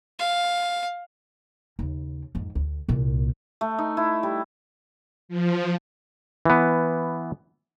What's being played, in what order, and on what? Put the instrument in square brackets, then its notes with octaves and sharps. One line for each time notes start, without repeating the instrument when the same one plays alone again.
[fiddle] F5
[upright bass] D#2 C#3
F2 G#2
D2
C2 A#2
[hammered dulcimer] A3
D#4
E4
G3
[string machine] F3
[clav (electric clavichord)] E3 B3